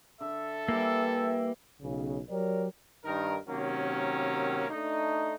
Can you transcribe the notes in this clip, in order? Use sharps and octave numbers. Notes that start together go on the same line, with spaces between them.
D3 A4 E5
E3 G3 A#3 G5
B1 C#3
F#3 G4 A#4 C#5 D5
G2 D#3 D#4 A#4
C3 D#3 F#3 A#3 C#4
A3 D4 D#4